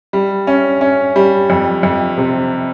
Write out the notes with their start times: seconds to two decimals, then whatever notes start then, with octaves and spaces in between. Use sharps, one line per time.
0.13 G3
0.47 C#4
0.81 C#4
1.16 G3
1.50 F2
1.83 F2
2.18 C3